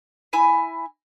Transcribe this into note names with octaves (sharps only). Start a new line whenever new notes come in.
E4 G#5 B5